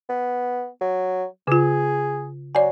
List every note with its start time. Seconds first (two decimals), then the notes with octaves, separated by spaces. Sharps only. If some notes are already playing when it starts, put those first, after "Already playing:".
0.09 B3
0.81 F#3
1.48 C#3 F4 G#4
2.55 F#3 D5 G#5